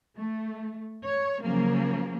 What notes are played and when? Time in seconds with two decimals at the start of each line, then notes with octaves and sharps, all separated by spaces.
0.15 A3
1.04 C#5
1.42 C#3 F3 F#3 A#3